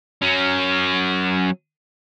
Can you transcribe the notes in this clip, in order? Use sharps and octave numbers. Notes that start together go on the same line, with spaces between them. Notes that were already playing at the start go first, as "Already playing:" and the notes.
F#3 C#4